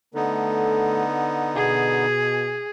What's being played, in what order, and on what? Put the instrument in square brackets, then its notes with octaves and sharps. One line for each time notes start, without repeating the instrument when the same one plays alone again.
[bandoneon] D3 B3 D#4 [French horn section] A3 A4
[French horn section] B2 [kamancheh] G#4